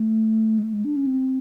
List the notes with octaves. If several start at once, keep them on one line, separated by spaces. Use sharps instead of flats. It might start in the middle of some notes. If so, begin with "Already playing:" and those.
Already playing: A3
G#3
A3
G#3
D4
C#4
C4